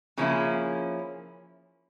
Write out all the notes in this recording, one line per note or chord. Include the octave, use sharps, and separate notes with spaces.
C#3 F3 A#3 C#4 E4